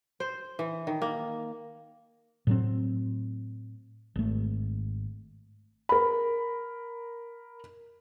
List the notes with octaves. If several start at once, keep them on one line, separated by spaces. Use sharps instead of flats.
C5
E3
D#3
A#3
A2 F#3 C4
G#1 A3
A#4 B5